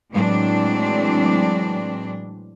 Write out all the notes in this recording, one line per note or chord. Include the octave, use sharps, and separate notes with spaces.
A2 E3 F#3 G#3 C4 D4